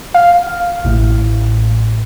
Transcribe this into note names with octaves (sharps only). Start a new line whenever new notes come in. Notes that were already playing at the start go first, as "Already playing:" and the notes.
F5
A1 A2